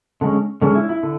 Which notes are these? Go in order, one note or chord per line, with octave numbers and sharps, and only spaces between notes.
D3 G#3 C#4
D3 G#3 C#4
E4
E4
D3